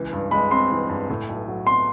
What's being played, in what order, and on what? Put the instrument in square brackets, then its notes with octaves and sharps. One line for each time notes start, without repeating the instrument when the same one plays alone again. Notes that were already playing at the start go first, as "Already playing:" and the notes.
Already playing: [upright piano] C#2 E3
G2
[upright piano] G#3 [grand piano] B5
[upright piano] C4 [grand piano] C6
[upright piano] E3
G2
A2
B1
F#3
[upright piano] B3 [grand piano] C6